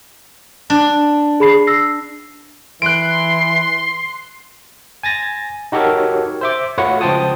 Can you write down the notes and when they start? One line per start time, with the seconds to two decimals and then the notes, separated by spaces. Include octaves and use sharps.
0.70 D4
1.40 G#4 B5 C7
1.67 E6 A#6 C7
2.82 E3 C6 F#6 D7
5.03 G#5 A6 A#6
5.72 D#4 F#4 G4 A4 A#4 C#5
6.41 C5 E5 D6
6.78 A3 F4 F#4 B4 C#5 F#5
7.01 C#2 F3 C5 G5 A5 D#6